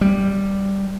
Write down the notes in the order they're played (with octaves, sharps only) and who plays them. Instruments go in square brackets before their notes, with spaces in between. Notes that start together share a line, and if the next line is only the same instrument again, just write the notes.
[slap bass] G3